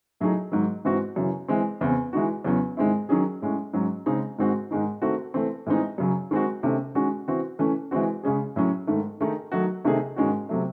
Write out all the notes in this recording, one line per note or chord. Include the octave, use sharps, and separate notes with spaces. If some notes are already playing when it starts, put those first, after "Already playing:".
A2 F#3 A3 D#4 G#4
G#2 D#3 F#3
G#2 E3 C4 F#4
F#2 C#3 E3
E3 G#3 C4
E2 C#3 E3 C4
E3 G#3 D#4 F#4
E2 C#3 F#3 C#4
G#2 D#3 G#3 C4 E4
D#3 F#3 C#4 G#4
A2 G#3 C#4
G#2 F#3 C#4
C#3 G#3 C4 D#4 G#4
G#2 D#3 G#3 C4 F#4
G#2 D#3 G#3 D#4
D#3 A3 C4 F#4
E3 A3 C4
A2 E3 G#3 C4 D#4
F#2 C#3 F#3
D#3 G#3 C4 F#4
C3 D#3 A3 C#4
D#3 G#3 C#4 F#4
E3 C4 F#4
E3 A3 C#4
E3 G#3 C4 F#4
C#3 G#3 C#4 G#4
A2 F#3 C#4
G#2 D#3 A3
D#3 A3 D#4 G#4
D#3 F#3 A3 D#4 F#4
C3 D#3 A3 D#4 G#4
G#2 D#3 G#3 C#4 F#4
C3 F#3 A3